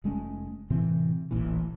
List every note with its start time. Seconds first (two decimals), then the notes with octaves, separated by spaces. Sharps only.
0.04 F1 G#3 A3 C#4
0.70 A2 C3 E3 C4
1.31 D1 A1 A#2 E3